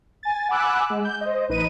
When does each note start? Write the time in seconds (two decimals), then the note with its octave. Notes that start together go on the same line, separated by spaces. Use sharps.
0.23 G#5 A6
0.49 F#5 G#5 B5 D6 E6 F#6
0.90 G#3
1.05 G6
1.21 C5 D#5
1.49 A1 D#4 B4 D#5 D#7